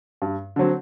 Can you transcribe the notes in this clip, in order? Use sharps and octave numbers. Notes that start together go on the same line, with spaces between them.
G2
D3 F#3 C4